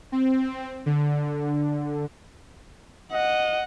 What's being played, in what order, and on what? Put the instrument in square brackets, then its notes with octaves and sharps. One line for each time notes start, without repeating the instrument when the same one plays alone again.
[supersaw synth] C4
D3
[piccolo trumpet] D#5 [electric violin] F#5